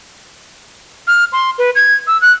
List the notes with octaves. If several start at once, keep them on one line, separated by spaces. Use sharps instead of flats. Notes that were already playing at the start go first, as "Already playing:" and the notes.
F6
C6
B4
G#6
E6
F#6